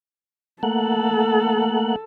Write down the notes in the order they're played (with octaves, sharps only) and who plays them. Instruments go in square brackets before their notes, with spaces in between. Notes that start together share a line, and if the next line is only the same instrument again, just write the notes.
[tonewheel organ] A3 A#3 F#5 [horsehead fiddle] A4